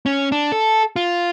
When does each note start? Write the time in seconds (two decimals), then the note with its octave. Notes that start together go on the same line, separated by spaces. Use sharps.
0.06 C#4
0.32 D4
0.52 A4
0.96 F4